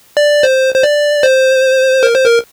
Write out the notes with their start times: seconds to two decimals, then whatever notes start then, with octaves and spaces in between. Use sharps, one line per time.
0.17 D5
0.43 C5
0.75 C5
0.83 D5
1.23 C5
2.03 A#4
2.14 C5
2.26 A#4